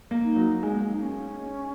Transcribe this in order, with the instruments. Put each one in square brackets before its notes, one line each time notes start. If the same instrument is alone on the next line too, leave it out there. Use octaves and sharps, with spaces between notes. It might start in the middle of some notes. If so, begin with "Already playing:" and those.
[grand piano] A#3
[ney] D#4
[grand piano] F#3
[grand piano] G#3 [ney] A#3
[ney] B3
A#3
D#4
C#4